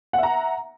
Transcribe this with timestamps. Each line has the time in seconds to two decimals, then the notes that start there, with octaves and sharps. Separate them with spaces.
0.13 F#5
0.18 E5
0.23 A#5